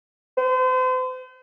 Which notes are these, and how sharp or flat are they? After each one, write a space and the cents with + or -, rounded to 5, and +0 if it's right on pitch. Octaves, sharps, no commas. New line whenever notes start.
C5 -40